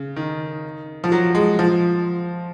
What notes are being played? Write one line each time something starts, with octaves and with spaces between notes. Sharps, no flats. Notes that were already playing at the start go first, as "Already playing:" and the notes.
Already playing: C#3
D#3
F3
F#3
G#3
F3